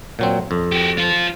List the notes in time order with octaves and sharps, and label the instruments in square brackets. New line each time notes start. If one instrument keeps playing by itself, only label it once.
[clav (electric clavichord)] A#2 F#3 C4
F2
[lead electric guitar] F#4 G4
F4 C5